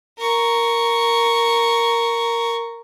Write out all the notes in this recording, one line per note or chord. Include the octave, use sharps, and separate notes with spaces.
A#4 C#6